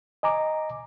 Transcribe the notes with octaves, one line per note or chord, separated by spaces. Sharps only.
D#5 G#5 A#5 D6